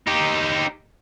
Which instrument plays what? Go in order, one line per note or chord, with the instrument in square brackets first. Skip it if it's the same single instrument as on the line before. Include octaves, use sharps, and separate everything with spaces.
[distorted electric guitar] D#4 G4